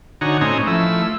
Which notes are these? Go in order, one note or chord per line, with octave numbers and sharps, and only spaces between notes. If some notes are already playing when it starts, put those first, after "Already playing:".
D3 D#4 F#4 C#5 G#5 A#5
A2 C4 C#4 D#5 G#5 A#5
F3 A3 E4 E5